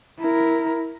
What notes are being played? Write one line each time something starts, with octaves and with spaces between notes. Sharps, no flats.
E4 A#4